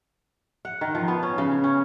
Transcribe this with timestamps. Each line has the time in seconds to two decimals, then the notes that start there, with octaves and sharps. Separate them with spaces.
0.65 F#5
0.81 D#3
0.95 F3
1.08 B3
1.23 C#4
1.38 C#3
1.64 C#4